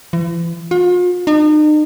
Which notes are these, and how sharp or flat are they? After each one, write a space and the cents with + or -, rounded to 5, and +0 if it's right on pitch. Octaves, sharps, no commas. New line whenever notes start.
E3 +40
F4 +40
D#4 -40